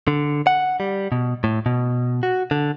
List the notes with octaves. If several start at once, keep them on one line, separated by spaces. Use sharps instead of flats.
D3
F#5
G3
B2
A2
B2
F#4
D3